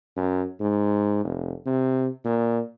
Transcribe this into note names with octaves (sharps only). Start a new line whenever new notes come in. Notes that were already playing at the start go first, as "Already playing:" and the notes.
F#2
G#2
F1
C3
A#2